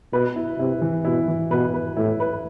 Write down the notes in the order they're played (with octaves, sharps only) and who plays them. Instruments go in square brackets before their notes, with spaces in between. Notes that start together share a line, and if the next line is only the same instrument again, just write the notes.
[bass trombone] B2 [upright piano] B4
[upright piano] E4
[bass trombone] C3 [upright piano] E4
[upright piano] E3
[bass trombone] B2 [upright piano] E4
[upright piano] E3
[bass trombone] B2 [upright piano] B4
[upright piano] B4
[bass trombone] A2 [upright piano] E4
[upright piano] B4